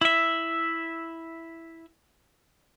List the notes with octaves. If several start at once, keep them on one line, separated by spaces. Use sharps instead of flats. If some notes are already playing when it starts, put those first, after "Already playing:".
E4 E5